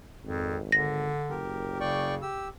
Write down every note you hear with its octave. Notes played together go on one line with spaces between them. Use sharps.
G#1 F2
D3 A#6
F#1 G4 A#4
C#3 D5 G5 C#6
G4 E6